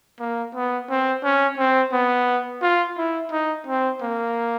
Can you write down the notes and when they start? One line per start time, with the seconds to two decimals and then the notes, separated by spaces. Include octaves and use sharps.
0.20 A#3
0.55 B3
0.90 C4
1.23 C#4
1.58 C4
1.92 B3
2.62 F4
2.98 E4
3.31 D#4
3.67 C4
4.01 A#3